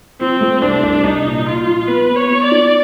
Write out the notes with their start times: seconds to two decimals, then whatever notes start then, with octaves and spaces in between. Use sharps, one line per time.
0.21 F3 C4
0.41 A3
0.62 C2 D4
0.83 C2
1.04 C2 D#4
1.25 A#2
1.46 A#2 F4
1.67 F3
1.88 B3 B4
2.09 B3
2.16 C#5
2.30 B3
2.45 D5
2.51 D#4